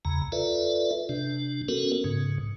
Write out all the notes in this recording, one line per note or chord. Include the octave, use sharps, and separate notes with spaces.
E2 C#3 A#5
F4 A4 B4 D5 E5
C3 D4
B3 C#4 F#4 A4 A#4
G#2 C#3